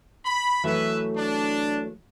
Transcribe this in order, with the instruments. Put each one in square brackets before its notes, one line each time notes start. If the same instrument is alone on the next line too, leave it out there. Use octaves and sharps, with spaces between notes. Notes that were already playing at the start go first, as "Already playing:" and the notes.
[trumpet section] B5
[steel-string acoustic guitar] E3 F#3 A3 [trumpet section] B4 E5
[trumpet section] D4